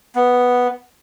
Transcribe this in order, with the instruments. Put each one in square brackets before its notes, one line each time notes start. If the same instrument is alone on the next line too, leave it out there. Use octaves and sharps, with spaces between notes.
[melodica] B3